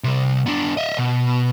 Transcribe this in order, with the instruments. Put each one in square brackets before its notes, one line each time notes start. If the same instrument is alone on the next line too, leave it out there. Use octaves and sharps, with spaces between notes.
[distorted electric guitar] C3 G3
B3 D4
D#5 E5
B2